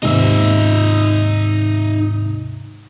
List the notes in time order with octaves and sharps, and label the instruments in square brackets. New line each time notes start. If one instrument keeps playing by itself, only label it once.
[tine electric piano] D#2 G#2 C3 [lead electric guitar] D#4 E5